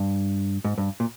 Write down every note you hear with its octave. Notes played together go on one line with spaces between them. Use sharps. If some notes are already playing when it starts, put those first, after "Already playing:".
Already playing: G2
G#2
G2
A#2